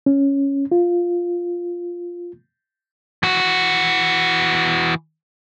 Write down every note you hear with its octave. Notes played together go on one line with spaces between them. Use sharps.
C#4
F4
E3 F#4